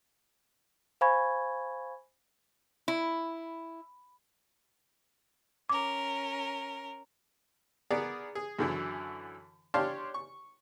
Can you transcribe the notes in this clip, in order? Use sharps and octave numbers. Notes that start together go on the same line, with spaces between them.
C5 F5 G#5 B5 C#6 G#6
E4
C#4 A#4 D6
B3 G#4 A#4 D5
G#4
F#2 D3 E3 F#3
D4 G4 C#5 F5 A5 C6
C#6